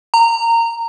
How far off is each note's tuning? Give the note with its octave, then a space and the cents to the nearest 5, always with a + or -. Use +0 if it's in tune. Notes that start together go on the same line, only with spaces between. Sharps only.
A#5 -20